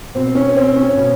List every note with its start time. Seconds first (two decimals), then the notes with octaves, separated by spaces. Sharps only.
0.15 B2 C4
0.35 C#4
0.56 C4
0.76 C#4
0.96 B2